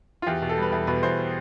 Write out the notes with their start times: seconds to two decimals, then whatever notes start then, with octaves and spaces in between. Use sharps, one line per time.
0.22 F4
0.27 E2 G4
0.42 B2
0.49 A4
0.58 G3 B4
0.73 E2 A4
0.87 B2 B4
1.03 E2 C5